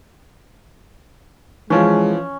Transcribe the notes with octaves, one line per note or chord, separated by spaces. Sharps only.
E3 F3 G#3 C#4